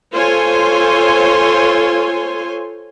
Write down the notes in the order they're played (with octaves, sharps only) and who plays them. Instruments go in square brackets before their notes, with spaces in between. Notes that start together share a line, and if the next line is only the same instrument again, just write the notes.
[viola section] F4 A4 C5 C#5 G#5 C6